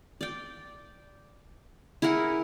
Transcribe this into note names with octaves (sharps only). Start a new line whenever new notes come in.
D5 G5
E4 G#4 A#4 F#5